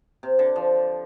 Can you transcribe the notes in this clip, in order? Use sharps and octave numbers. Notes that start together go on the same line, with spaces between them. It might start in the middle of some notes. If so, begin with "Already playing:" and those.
C3
D3
F3